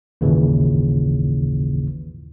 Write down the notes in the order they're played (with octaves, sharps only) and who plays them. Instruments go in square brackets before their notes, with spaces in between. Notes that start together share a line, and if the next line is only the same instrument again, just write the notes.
[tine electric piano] G#1 D#2 A#2 C#3 E3